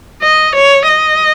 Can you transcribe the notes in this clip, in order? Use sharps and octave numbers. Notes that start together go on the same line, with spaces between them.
D#5
C#5
D#5